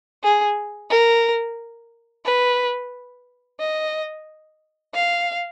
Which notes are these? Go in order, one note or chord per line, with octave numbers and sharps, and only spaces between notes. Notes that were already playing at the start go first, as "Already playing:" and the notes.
G#4
A#4
B4
D#5
F5